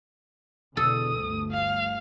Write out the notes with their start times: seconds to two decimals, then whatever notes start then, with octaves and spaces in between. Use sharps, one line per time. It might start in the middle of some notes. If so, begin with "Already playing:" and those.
0.77 E2 B2 D3 A4 D#6
1.18 G1 D2 A3
1.51 F5